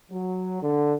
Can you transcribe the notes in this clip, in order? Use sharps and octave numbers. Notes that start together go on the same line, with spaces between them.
F#3
D3